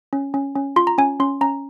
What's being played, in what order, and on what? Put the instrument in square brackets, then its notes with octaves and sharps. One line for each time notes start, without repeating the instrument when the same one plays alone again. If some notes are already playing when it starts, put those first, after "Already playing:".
[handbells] C#4
C#4
C#4
F4 C6
A#5
C#4 G#5
C#4 C6
C#4 A#5